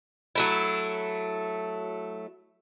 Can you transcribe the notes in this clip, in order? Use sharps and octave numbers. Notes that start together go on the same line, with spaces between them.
F#3 A3 E4